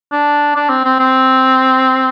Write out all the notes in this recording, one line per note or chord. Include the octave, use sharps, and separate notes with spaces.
D4
D4
C4
C4
C4